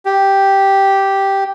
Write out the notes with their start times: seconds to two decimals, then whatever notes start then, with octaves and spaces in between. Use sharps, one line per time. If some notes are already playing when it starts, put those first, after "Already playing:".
0.05 G4